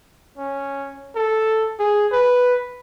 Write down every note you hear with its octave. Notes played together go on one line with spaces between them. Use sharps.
C#4
A4
G#4
B4